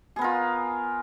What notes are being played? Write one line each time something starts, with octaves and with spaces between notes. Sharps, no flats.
B3 F4 G#4 A#4